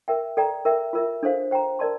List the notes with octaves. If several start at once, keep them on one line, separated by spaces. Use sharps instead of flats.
A#4 E5 G5
A4 D5 G5 A#5
A#4 E5 G5
F4 A#4 E5
D4 A4 C5 F5
C5 G5 A#5
A#4 D5 A5 C6